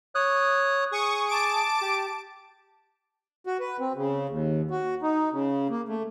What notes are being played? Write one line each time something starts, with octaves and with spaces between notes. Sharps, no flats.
C#5 D#6 F#6
G#4 C#6 D#6
A5 D6 D7
G4
F#4
B4
C4
C#3
D#2
F#4
D#4
C#3
A#3
A3